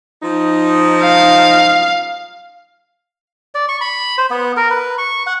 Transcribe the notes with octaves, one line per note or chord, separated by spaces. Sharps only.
F3 D#4
F5
D5
C#6
B5
C5
B3
A#4
B4
C#6
F#5